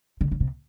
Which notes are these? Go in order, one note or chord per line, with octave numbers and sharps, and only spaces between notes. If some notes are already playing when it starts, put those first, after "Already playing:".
D3
C#3
C3